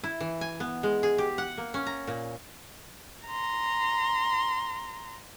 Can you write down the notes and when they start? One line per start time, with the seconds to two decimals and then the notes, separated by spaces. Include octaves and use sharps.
0.04 E4
0.20 E3
0.41 G#5
0.60 B3
0.83 G#3
1.03 G#4
1.18 G4
1.38 F#5
1.58 A#3
1.74 C#4
1.87 A#5
2.07 A#2
3.27 A#5 C6